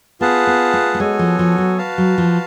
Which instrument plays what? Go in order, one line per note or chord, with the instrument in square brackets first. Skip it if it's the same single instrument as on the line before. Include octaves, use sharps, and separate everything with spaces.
[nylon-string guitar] B3 [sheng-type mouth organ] F4 G#4 B4 F#5 A5
[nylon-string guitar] B3
A3
A3
[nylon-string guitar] G#3 [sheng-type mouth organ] B3 F#4 A4 C#5 G#5
[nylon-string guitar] F3
F3
F#3
[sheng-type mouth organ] F#4 B4 F5 A5
[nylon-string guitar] F#3
F3